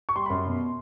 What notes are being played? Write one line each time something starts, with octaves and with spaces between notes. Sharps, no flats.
C#6
G3 C6
B5
F#2 C6
B2